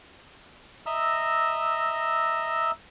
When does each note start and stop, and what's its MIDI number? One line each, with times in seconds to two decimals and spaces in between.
0.86 2.71 75
0.86 2.71 76
0.86 2.71 82
0.86 2.71 88